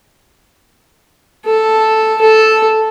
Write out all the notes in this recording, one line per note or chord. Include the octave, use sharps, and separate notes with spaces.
A4
A4